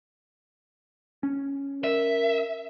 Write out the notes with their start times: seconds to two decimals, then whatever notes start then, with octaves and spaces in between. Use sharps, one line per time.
1.23 C#4
1.84 A#4 E5